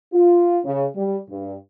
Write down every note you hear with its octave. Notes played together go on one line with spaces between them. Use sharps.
F4
C#3
G3
G2